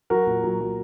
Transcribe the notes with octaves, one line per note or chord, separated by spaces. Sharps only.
F#3 F#4 A#4
A#2
F#3
F#3